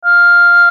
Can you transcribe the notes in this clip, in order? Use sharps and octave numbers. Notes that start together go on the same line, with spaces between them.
F5